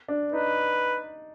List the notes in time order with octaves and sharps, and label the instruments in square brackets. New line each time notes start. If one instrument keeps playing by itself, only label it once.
[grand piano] D4
[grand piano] D#4 [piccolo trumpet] B4